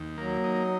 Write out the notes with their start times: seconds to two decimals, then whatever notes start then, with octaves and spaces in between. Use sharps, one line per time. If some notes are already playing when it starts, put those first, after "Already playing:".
Already playing: D#2
0.17 F#3 A#3
0.44 D#4